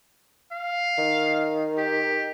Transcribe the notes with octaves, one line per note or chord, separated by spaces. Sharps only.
F5
D#3
G4